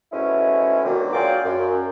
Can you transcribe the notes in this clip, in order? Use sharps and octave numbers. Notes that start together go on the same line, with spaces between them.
G#2 B2 G#3 A3 C#4 E4
B2 D3 D#3 F#3 G3 A#3
F#3 F4 G#4 D5 G5 D6
F#2